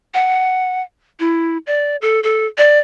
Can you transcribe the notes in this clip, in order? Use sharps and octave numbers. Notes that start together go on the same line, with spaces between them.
F#5
E4
D5
A4
A4
D5